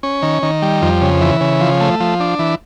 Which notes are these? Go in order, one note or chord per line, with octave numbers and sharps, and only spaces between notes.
C#4
D#3
D#3
G3
F2
C#3
E3
C#3
F3
A3
F3
D4
E3